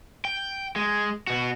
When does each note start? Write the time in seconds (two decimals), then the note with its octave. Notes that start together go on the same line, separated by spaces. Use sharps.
0.25 G5
0.76 G#3
1.27 B2 F#4